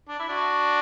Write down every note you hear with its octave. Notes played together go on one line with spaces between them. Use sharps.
D4
E4
D4 F#4